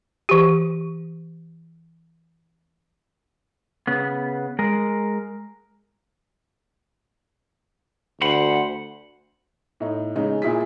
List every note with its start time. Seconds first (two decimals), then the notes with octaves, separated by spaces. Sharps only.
0.29 E3 G4
3.87 C#3 B3
4.59 G#3 A#4
8.21 D2 C5 F#5 B5
9.80 A2 D#4
10.16 C#3 G#3 D#4
10.42 A#2 E4 G#4 B6